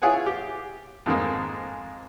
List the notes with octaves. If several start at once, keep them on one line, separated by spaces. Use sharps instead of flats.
E4 F4 G#4 C#5 F#5 G#5
G4
F2 G#2 D#3 G#3 A#3